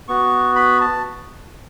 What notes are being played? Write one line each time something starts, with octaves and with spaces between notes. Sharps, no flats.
B3 F#4 C#6
B5
A5